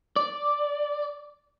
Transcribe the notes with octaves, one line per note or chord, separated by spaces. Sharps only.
D5